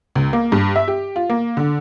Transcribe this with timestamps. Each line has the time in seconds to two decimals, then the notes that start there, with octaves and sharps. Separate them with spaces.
0.15 C#2
0.33 A#3
0.52 G2
0.76 E5
0.88 G4
1.16 F4
1.30 A#3
1.57 D3